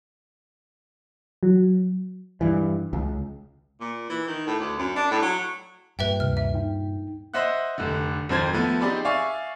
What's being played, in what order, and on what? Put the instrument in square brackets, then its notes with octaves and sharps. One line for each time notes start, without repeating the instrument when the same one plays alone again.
[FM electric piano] F#3
[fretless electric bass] G2 E3
C#2
[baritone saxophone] A#2
E3
D#3
A2
D2
F#2
D4
A2
F#3
[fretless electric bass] G2 A#2 [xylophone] B4 E5 G5
[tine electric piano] D2 C3 [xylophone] F6
[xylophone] E5
[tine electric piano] D#4 G5
[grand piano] C5 D#5 E5 F#5 F#6
F1 D3
G#1 F2 F3 C5 G5 G#6
F3 A3 B3
C4 D#4 G4 G#4 D5 B5
D5 E5 F5 G#5 C#6